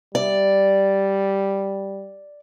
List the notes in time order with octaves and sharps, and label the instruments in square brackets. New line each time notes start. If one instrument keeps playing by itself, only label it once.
[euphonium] G3 [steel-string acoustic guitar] D5